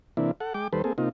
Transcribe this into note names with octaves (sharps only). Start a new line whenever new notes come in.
C3 E3 A#3 D4 E4
A4 F#5
G#3 G5 D6
D#2 G3 A4 B4 C5
A#3 C4 G#4 A4
C3 A#3 D#4 F4